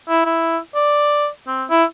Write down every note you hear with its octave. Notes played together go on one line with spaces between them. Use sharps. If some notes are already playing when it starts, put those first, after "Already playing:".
E4
E4
D5
C4
E4